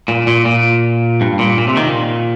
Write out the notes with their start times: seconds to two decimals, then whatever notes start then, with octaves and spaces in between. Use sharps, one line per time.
0.08 A#2
0.27 A#2
0.45 A#2
1.21 G2
1.39 A#2
1.58 A#2
1.68 C3
1.77 D#3
1.87 A#2